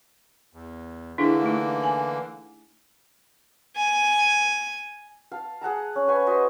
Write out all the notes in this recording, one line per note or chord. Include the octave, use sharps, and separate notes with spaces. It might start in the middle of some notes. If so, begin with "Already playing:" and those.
E2
D3 E3 A#3 D4 E4 G#4
A3 D#4
G#5
G#5
F5 A5
G#4 F#5 A5 A#5
C#4
B4 G#5 C#6
F#4 B4 C5 D#5